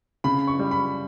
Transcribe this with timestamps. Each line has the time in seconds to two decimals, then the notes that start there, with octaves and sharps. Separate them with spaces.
0.24 C#3 B5
0.47 C#6
0.59 G3
0.71 B5